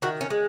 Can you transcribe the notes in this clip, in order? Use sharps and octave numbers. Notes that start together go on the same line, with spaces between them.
D#3 F#4
C#4
G#3